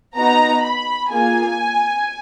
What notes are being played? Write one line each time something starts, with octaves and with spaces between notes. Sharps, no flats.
B3 D#4 F#4 A#5
B5
A#3 F4 G#4 G#5